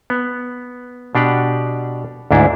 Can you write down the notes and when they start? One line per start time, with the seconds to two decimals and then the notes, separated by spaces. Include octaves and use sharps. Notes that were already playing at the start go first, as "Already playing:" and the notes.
0.10 B3
1.15 B2 D4 G4 F#5
2.31 D2 G#2 D4 E4